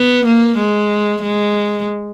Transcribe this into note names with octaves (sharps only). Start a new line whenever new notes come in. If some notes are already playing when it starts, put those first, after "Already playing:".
Already playing: B3
A#3
G#3
G#3